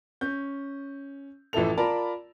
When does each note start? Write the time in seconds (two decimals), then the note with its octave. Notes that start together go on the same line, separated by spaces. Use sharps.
0.21 C#4 G6
1.53 A1 E3 F3 E4 A4 F7
1.77 F4 A#4 D5 A5 B5